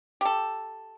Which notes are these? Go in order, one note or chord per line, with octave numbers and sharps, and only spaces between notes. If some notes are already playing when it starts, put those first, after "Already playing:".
G4 A4